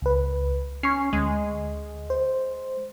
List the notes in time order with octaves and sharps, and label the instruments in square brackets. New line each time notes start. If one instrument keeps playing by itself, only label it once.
[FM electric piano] C#2 B4
[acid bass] C#4 [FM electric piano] C#6 C7
[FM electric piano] D2 [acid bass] G#3
[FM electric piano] C5